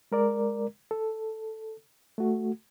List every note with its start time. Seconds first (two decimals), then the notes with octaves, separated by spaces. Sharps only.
0.12 G#3 A#4 D5
0.91 A4
2.18 A3 F#4